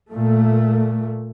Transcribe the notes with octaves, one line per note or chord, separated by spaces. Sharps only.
A#2 A3